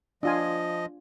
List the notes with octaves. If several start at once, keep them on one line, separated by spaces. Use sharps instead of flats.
F3 D4 F4 D#5 G#5